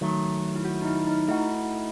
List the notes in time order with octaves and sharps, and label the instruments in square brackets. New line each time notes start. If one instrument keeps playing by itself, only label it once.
[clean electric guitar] D#3 F#3 A3
[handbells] E4
F#4
D#4
E4
D#4
[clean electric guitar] A3 D#4 F#4 [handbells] E4